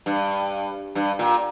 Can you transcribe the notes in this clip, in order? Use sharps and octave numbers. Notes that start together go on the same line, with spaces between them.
G2
G2
A#2